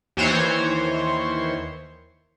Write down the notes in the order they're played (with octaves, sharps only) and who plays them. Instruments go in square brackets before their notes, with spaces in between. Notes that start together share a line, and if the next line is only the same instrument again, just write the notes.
[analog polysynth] D#2 E3 C5 C#5